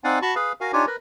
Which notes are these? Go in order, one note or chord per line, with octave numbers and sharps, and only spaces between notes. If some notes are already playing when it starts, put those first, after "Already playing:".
C4 D#4 D5 F5 F#5 G#5
F#4 A5 B5 C#6
G#4 B4 F5
F#4 A#4 F5 G#5
D4 D#4 F4 G4 C#5 G#5
A#4 B4